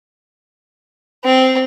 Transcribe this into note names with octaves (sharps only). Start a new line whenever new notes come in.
C4